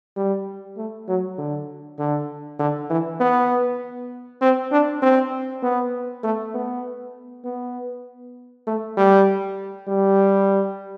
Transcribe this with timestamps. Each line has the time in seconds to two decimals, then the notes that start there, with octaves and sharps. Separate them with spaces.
0.16 G3
0.77 A3
1.08 F#3
1.38 D3
1.99 D3
2.59 D3
2.90 E3
3.20 B3
4.42 C4
4.72 D4
5.02 C4
5.63 B3
6.24 A3
6.54 B3
7.45 B3
8.67 A3
8.97 G3
9.88 G3